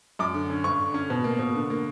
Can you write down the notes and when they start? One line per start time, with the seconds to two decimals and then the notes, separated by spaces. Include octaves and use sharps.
0.19 F#2 D6
0.34 D3
0.50 C#4
0.64 G2 C#6
0.80 D3
0.94 C#4
1.10 B2
1.24 A#3
1.39 B2
1.55 D3
1.70 A#3